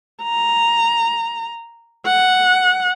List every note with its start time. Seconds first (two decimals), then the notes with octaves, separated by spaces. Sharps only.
0.23 A#5
2.06 F#5